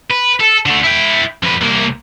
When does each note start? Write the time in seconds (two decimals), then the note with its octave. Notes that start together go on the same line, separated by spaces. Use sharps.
0.10 B4
0.40 A4
0.66 D3 A3
0.83 E4 G5
1.43 F2 B4
1.61 C2 A#3